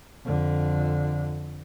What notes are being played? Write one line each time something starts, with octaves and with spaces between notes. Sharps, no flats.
F2 D3